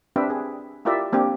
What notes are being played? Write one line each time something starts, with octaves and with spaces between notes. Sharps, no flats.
C4 D4 G4 B4 E5 G5
G#4
E4 F4 G4 A#4 D5 E5
A#3 C4 D4 G4